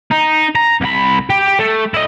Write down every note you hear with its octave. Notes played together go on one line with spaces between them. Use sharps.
D#4
A#5
C2 B5
G4
A3
E4 D#5